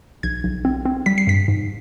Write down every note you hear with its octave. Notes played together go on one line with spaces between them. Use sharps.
B1 G#6
B1
C4
C4
G3 B6
C7
G2 B6
G#2